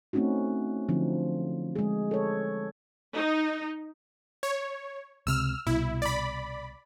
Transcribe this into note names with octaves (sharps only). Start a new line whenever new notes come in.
A3 C4 C#4 D#4 F#4
D3 F3 F#3 C4 D#4
G#3 G#4
A4 C#5
D#4
C#5
C#2 C3 E6 F6
C2 B2 E4
D5 B5